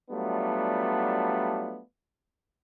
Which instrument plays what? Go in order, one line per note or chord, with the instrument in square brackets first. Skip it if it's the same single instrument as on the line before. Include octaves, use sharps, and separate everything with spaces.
[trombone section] F#3 G3 A3 B3 D4 F4